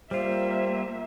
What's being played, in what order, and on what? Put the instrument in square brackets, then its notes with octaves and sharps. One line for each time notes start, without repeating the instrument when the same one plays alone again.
[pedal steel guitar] G3 F4 [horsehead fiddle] A#3 E5 [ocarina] C5